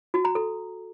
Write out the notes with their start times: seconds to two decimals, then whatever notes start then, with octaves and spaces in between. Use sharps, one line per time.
0.14 F#4
0.25 A#5
0.35 A4